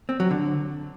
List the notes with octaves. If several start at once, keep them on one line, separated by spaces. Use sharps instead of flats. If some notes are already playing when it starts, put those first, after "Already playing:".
C4
F#3
D3